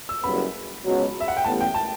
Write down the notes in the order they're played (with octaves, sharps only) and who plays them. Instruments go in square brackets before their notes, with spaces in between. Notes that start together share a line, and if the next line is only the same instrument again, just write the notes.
[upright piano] E6
[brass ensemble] F#1 F#2 C#3 G3 B3 [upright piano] B5
[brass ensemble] C#2 B2 F#3
[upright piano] E5
F#5
G5
[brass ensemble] A1 A2 G3 B3 [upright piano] A5
[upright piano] G5
A5